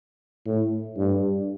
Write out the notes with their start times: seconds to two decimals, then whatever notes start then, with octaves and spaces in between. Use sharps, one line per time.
0.45 A2
0.97 G2